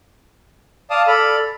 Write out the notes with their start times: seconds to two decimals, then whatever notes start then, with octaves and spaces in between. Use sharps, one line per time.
0.90 D5 F5 A5 D#6
1.07 A4 D5 B5 F6